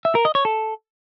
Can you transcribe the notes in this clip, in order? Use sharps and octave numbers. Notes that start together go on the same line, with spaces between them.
E5
A#4
D#5
C#5
A4